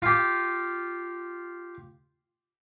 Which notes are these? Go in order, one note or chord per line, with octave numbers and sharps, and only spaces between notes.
F4 G4